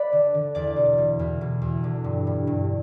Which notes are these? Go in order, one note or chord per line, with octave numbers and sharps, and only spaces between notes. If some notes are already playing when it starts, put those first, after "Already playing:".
Already playing: B4 D5
D3
D3
E2 D5
B2
B2
E2
B2
E2
D3
G2
G2
G2